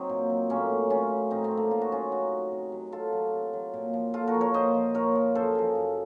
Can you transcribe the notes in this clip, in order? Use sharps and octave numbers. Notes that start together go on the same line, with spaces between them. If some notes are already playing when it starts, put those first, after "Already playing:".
Already playing: F#3 C4 D#4
A#2
F#3
A2 A#3 C#4
F#3
A2 C#4 F4
F#3
A2 C4 D#4
A3 C4
F#3
A#3
A2 F4
F#4
F#3 C#4 F4
C3 D#4 F#4
F#3
C3
F#3
C3 F4 A4
F#3
C3
F#3
A#2
F3
A#2 F4 A4
F#4 A#4
F3
A#4 C#5
A#2 C5 D#5
F3
A#2 A#4 C#5
F3
F#2 A4 C5
C#3 F3
F#2